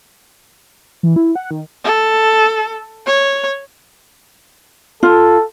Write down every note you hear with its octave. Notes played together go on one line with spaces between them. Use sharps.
E3
E4
F#5
D#3
A4
C#5
F4 A4